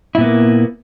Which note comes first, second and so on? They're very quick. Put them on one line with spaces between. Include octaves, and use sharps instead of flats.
E4 A#2 B3 A#3